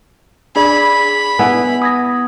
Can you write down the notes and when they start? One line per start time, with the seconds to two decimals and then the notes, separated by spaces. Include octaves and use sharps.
0.56 D4 G#4 D5 B5
1.39 B3 E4 G#5
1.82 D#6 G#6 A#6